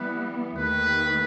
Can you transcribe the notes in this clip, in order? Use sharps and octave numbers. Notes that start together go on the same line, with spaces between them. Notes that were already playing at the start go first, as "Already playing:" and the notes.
Already playing: E3 G3 B3 B4
D#2 D#3 A3 B4